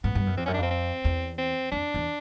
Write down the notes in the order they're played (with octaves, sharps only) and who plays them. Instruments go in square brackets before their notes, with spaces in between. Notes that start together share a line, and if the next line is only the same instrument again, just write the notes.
[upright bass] G#2 [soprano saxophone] B3
[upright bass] G2
F#2
[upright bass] F2 [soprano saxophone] C4
[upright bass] F#2 [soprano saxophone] C#4
[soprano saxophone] D4
[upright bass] F2 [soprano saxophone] C4
[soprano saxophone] C4
[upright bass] E2
[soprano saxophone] C4
[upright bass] F2 [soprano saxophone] D4
[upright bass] E2